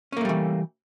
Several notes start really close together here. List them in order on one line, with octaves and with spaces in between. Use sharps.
C#4 A#3 A3 G3 E3